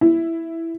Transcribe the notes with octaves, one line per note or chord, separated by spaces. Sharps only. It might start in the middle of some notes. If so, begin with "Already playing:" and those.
E4